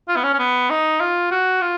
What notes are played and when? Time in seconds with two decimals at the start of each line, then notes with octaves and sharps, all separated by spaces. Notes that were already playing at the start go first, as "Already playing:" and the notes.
0.09 F4
0.16 B3
0.24 C#4
0.34 C#4
0.39 B3
0.70 D#4
1.00 F4
1.31 F#4
1.61 F4